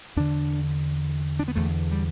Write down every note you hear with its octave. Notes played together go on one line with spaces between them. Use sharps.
E2 D3 D4
D4
B3
E2 D3 A3
G3